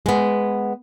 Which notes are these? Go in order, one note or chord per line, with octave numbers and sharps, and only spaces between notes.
G#3 B3